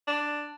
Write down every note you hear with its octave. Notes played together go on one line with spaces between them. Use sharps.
D4